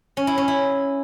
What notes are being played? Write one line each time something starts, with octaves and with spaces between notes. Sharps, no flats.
C#4
E4
C#4
E4